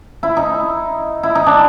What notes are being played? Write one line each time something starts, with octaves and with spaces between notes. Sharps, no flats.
E4
D#4
E4
D#4
D4